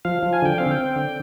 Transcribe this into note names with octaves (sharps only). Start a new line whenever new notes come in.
F3 F5
F3
G#5
D3 G5
C4 F5
G5
C4
D3